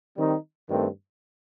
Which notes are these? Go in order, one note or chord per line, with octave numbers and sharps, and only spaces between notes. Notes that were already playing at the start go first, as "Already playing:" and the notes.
D#3 G3 C4 D#4
G2 D#3 A3 C4